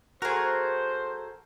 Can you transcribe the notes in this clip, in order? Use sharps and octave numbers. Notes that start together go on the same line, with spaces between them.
A3 F#4 G#4 A#4 C5